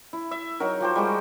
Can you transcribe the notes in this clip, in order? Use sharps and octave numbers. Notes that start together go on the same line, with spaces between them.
E4
E5
F#3 D#4 F#4 A#4
F3 G4 C5
G3 G#3 F#4 D6